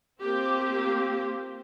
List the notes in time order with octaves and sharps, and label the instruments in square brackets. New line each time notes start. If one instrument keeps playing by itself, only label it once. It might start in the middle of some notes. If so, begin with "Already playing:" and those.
[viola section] A#3 C4 F4 G4